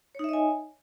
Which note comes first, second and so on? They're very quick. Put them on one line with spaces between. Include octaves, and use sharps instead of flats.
C#5 D#4 E5 D#5 G#5